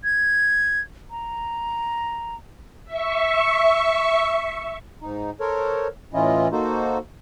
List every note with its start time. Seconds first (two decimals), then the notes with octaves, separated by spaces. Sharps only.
0.04 G#6
1.11 A#5
2.85 E5 C#6
5.02 G#2 D#4
5.40 A4 A#4 C5 C#5
6.14 A2 E3 C#4 E4 F4 D#5
6.52 A#3 D#4 F#4 A4 C5